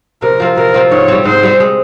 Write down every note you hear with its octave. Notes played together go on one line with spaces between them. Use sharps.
C3 A#4
F3 C4 F4
C3 A#4
F3 C4 F4
G#2 C#5
G3 C4
G#2 C5
G3 C4
G#3